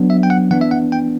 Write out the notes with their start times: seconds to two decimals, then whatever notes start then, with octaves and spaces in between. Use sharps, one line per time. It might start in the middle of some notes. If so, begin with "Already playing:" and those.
Already playing: F#3 B3 D4
0.10 E5
0.23 G5
0.30 F#5
0.51 E3 B3 D4 F#5
0.61 E5
0.71 F#5
0.92 G5